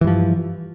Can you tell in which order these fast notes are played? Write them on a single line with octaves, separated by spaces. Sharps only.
E3 G2 F3